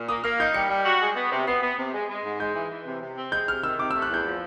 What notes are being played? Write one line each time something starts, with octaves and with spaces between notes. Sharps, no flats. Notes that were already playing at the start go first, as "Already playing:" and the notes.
Already playing: A#2
A#3 D#6
A#3 F6
D#4 G6
G3 C#7
G3
F#4
G#3
B3
C3
B3 C7
B3
C3
G#3
G#3
G#2
G#3 G6
E3
E3
C3
C3
C4
G#3 G6
C3 F6
D#3 E6
C3 D6
E6
A3
F#6
E2 G6
F3